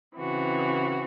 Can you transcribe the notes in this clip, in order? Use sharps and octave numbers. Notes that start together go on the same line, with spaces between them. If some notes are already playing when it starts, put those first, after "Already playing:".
C#3 E3 C4 F#4